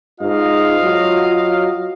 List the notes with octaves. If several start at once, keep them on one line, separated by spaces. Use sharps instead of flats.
G#2 F4 D#5 F5
F#3